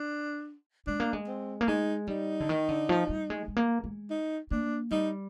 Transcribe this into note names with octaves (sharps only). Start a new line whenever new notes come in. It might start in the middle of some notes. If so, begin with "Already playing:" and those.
Already playing: D4
G#3 D4
A#3
G#3
C4
A#3
G#3 D#4
G3 D#4
D3
D#3
D3
F3
G3
G#3
G#3
A#3
G#3
D#4
A#3 D4
G3 D#4